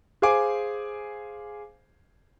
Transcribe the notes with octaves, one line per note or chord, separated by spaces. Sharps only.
G#4 C5 F5 G#5 D6